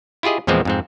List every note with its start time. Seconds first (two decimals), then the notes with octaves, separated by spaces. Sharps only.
0.23 E4 F4 G4 G#4 D#5
0.47 E2 A#2 E3 F3 G#3 C4
0.65 F2 G#2 C4